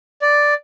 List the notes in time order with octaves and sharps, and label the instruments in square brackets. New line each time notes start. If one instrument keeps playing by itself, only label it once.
[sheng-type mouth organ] D5